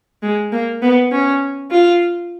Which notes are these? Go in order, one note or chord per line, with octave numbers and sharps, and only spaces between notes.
G#3
A#3
B3
C#4
F4